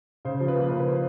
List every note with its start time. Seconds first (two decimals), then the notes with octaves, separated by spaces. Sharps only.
0.25 C#3 C5
0.40 F3
0.48 B4
0.56 A#3
0.71 C#3 C5
0.80 B4
0.88 C5